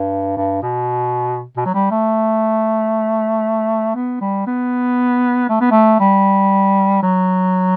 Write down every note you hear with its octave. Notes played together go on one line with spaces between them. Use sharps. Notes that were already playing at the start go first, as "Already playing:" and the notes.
Already playing: G2
G2
B2
B2
F#3
G3
A3
B3
G3
B3
A3
B3
A3
G3
F#3